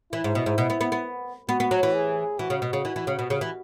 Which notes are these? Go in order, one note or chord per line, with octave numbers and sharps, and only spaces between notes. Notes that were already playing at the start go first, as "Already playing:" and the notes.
E3 E4
G#2
B2
G#2
B2
B3
B3
B3
B3 F#4
B3
F#3
E3
G#4
E3 F#4
C#3
B2
C#3
E3
E3
C#3
B2
C#3
E3